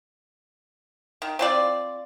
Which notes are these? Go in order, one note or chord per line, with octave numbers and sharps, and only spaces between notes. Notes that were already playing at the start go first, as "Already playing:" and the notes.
D#3
C4 F4 D5